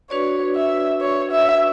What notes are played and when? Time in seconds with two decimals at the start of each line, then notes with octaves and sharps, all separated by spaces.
0.10 D4 F#4 B4 C#5 D5
0.56 E5
1.01 C#5
1.32 E5